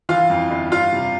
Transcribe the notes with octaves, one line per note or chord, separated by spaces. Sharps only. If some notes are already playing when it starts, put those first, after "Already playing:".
E3 F4 F5
F2
G1
G3 F4 F5
C3